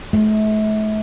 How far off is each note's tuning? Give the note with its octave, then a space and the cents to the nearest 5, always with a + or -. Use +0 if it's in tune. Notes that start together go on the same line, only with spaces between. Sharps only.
A3 -35